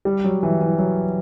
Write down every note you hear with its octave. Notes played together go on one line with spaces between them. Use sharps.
G3
F#3
E3
E3
F#3